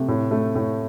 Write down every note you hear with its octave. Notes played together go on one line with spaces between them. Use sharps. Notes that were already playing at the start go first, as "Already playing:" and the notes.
Already playing: C3 A3
A2
A3
A2